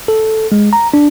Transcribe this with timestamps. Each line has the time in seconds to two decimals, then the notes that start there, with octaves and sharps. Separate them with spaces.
0.08 A4
0.52 G#3
0.73 A#5
0.94 D4